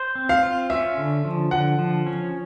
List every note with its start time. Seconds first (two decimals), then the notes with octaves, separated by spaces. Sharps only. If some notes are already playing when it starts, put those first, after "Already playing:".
Already playing: C5
0.15 C4
0.29 F5
0.43 F4
0.70 C#4 E5
0.98 D3
1.25 F3
1.51 D3 F#5
1.79 F3
2.07 C#4